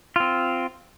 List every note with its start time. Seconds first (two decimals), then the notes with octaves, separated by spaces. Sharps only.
0.16 C4 F4